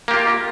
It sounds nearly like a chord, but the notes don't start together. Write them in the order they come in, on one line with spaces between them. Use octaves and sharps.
A#3 G4 F4